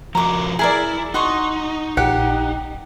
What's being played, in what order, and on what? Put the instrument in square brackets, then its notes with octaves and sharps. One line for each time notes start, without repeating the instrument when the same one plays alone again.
[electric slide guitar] F3 F#4 A#4 [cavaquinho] A#5 D6
[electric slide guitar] E4 [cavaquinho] G#4 A#4 D5
[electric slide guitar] D#4 [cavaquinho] F#4 C6 C#6
[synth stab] A#1 F#5 [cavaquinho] G4